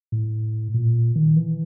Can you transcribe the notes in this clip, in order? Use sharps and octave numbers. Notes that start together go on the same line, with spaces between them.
A2
A#2
D#3
E3